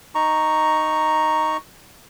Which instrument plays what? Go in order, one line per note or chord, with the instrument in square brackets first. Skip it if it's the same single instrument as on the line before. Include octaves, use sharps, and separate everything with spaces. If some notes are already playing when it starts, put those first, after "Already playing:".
[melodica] D#4 A#5 C#6